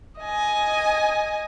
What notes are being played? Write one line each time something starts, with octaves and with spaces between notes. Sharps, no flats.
D#5 G#5